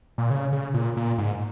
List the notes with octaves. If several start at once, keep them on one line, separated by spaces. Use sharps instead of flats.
A#2
C#3
C#3
A#2
A#2
G#2